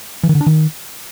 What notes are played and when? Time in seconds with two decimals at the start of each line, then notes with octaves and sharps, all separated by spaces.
0.23 E3
0.29 D#3
0.35 D3
0.41 D4
0.46 D#3